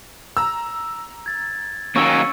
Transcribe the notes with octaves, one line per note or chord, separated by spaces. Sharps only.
A#5 E6
G#6 A6
D#3 F#3 A#3 C#4 C#6 E6 C#7